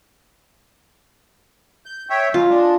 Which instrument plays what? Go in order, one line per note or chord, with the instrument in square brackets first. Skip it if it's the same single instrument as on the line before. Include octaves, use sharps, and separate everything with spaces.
[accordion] G6
C#5 E5 G5
[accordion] F#3 G#3 [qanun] F4
[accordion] G#3 D4